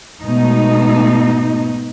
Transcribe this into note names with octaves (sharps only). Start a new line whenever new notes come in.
G#2 B2 A3 D#4